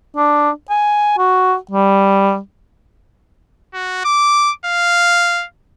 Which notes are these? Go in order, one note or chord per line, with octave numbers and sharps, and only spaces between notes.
D4
G#5
F#4
G3
F#4
D6
F5